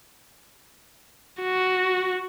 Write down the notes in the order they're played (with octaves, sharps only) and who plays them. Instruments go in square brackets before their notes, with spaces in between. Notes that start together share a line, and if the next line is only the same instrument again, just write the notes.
[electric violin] F#4